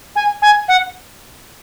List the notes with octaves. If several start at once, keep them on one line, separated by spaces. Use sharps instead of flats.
G#5
G#5
F#5